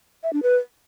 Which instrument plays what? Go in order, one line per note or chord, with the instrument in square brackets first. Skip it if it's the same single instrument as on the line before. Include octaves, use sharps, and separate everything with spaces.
[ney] E5
D4
B4